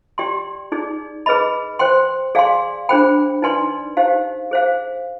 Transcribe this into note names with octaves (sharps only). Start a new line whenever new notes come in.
G4 D5 G5 C6
D#4 G#4 D5
G#4 B4 D#5 B5
C5 G5 C6
G#4 D5 F5 G#5 C6
D4 G#4 C5 G5 B5
D#4 B4 D5 G#5 C6
D#4 G4 C5 F5
G#4 C5 F5